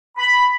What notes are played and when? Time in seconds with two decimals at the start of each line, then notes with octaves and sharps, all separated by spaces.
0.18 B5